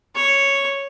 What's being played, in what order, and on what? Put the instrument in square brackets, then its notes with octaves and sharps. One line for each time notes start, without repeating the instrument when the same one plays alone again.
[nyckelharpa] C#5